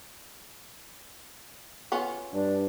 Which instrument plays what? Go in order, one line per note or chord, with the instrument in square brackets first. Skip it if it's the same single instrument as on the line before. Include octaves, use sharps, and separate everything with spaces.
[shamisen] B3 C#4 F4
[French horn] G2 [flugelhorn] D4